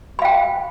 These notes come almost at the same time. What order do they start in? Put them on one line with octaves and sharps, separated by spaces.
B5 F5 G5